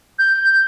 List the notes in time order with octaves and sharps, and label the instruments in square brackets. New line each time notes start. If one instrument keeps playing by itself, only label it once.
[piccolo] G6